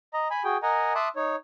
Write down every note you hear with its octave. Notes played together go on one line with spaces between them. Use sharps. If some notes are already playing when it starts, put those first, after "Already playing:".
D#5 A#5
G#5 B5
F#4 G#4 G5
A#4 D#5 F#5 G#5 A#5
E5 A5 C6 D6 D#6 F#6
D#4 C#5